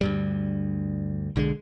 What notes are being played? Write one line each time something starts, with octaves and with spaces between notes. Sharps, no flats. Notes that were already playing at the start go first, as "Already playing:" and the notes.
D2 G2 G3
B1 D3 F3 G#3